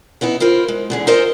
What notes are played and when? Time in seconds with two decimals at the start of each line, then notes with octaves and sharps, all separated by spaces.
0.21 E3 B3 D#4 E4
0.40 E4 F4 A#4 C5
0.68 G#3
0.90 E2 D3 G#4
1.07 D#4 F4 A#4 C5 D#5 E5